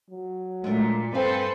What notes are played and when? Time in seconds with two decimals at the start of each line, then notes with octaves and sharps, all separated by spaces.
0.10 F#3
0.64 A#2 G#3 A3 D4
1.14 G2 C4 A4 B4 C5 F5 G#5